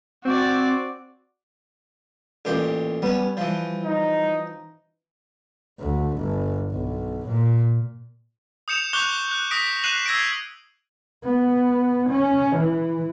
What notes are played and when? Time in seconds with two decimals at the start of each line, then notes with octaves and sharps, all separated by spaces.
0.25 C4 F#4 D5
2.45 A1 A#2 G4
3.02 G3 B3 C#4
3.37 E3 F3
3.84 D#4
5.80 D2
6.16 G1
6.71 B1
7.27 A#2
8.68 D#6 G6 C#7 E7 F7
8.93 C#6 D6 F#6 G6 F7 G7
9.31 F#6
9.51 D#6 A#6 B6 D7
9.84 F#6 C7 D#7 E7 F#7
10.06 E6 G#6 A#6 C7 D7
11.24 B3
12.10 C#4
12.56 E3